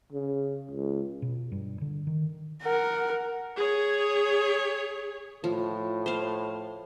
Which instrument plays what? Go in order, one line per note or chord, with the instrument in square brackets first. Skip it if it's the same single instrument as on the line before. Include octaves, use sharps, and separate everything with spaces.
[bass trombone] C#3
C#2
[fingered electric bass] B2
G2
D3
D#3
[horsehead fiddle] A#4 F#5
[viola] G#4 C#5
[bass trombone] A2 [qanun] F3
[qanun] C5 F5